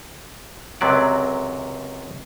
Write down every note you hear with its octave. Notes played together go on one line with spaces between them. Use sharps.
C#2 F#2 C3 F#3 D5